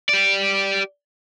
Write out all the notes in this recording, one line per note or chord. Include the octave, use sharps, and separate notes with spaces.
G4 D5